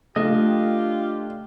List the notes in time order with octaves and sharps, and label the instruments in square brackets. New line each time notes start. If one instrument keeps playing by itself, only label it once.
[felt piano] A3 [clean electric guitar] D4 D#5 [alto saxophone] F4 [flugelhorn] G4